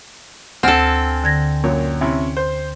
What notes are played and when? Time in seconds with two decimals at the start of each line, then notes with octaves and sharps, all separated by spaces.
0.63 D2 C4 A4 F#5 G#5 F6
1.24 D3 G#6 A#6
1.64 F#2 A#2 C#5
2.01 C3 C#4 E4
2.37 C5